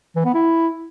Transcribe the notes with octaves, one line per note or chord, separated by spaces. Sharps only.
E3
B3
E4